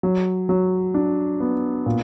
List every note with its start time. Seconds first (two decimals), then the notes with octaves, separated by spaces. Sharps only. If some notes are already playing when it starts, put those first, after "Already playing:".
0.03 F#3
0.49 F#3
0.94 D4
1.40 B3
1.86 A#2